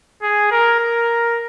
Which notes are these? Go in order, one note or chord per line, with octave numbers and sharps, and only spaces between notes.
G#4
A#4
A#4